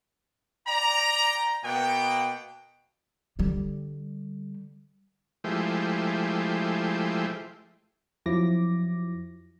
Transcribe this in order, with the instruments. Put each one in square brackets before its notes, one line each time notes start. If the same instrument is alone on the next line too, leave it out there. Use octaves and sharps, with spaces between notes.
[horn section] D5 G5 A#5
B2 A#3 B3 F#5 G5
[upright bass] D3 G3
[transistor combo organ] F3 G#3 A3 E4 G4 C5
[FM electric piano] F2 F3 F#3 E4 D6 A#6